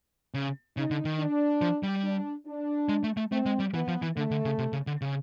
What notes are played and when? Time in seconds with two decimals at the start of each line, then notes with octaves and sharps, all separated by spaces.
0.34 C#3
0.77 C#3 D#4
0.91 D3
1.05 D#3
1.19 D4
1.61 F3
1.83 G3
2.04 D4
2.46 D4
2.89 G#3
3.04 A3
3.17 A3
3.32 A3 C4
3.46 G#3
3.59 G3
3.74 E3 B3
3.88 F3
4.02 E3
4.16 D3 A3
4.31 D3
4.45 C#3
4.58 C3
4.73 C#3
4.87 D3
5.02 C#3